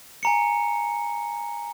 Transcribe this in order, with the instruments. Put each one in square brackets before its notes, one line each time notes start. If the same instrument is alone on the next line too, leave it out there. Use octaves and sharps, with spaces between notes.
[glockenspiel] G#5 A#5 C#7